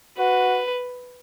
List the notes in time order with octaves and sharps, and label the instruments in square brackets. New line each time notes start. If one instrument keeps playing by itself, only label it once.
[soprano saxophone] F#4 [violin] B4